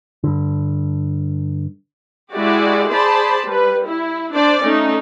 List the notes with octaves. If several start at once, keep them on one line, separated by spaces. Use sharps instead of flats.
G2 D3
G#3 E4 F#4 G4 D5
G#4 C5 D5 A5 B5
G3 B4
E4
D4 C5 D5
A3 C#4 D#4